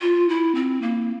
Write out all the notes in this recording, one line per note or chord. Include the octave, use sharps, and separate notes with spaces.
F4
E4
C4
A#3